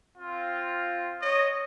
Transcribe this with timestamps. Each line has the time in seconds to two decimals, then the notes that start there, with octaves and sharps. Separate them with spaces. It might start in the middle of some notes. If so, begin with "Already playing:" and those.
0.18 C4 F4
1.21 C#5 D#5